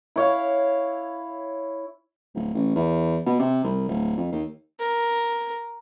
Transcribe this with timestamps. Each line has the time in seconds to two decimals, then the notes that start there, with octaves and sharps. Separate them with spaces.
0.16 E4 C#5 F5
2.34 D1
2.55 A1
2.76 E2
3.26 B2
3.39 C3
3.64 C2
3.88 D1
4.17 F2
4.32 D#2
4.80 A#4